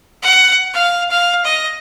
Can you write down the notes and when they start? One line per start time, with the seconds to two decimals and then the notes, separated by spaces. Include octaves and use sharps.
0.22 F#5
0.74 F5
1.11 F5
1.45 D#5